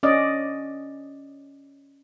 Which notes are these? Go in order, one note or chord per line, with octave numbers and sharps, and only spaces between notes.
C#4 D5 D#5